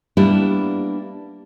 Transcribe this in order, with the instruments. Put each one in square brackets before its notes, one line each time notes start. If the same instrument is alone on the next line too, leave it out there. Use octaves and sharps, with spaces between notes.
[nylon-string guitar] G3 A#3 B3 D4 E4 G4